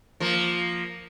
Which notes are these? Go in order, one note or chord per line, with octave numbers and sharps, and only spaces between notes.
F3 A#3